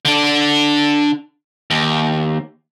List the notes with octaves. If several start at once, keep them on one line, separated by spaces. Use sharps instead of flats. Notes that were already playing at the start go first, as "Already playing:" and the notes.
D3 D4
D#2